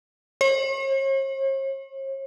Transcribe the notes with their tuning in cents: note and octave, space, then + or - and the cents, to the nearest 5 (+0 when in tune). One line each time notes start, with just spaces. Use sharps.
C#5 -45